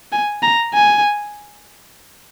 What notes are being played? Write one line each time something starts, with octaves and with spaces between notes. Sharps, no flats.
G#5
A#5
G#5